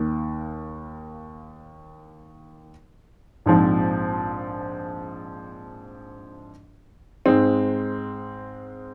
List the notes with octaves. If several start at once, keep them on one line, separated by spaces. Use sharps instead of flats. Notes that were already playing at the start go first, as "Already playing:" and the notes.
Already playing: D#2 D#3 A#3
A#1 G#2 F3 C4
G#2 G#3 C4